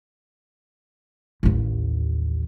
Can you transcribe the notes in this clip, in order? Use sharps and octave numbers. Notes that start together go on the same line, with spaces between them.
A1 D#2